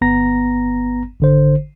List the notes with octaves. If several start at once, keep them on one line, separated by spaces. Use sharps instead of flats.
G1 B3 A#5 A#6
G#1 D3 C5